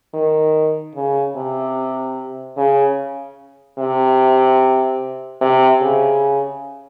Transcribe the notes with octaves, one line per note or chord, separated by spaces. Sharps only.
D#3
C#3
C3
C#3
C3
C3
C#3